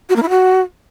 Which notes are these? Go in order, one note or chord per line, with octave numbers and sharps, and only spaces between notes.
F#4
A#3
E4
F#4